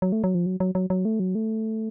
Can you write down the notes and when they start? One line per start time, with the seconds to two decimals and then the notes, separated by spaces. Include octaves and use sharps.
0.02 F#3
0.12 A3
0.24 F#3
0.35 F3
0.46 F#3
0.60 F#3
0.75 F#3
0.90 F#3
1.05 A3
1.20 F#3
1.35 A3